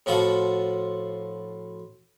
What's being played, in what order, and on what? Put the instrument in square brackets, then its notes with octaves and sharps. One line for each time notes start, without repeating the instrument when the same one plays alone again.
[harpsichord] A2 F3 F4 F#4 A4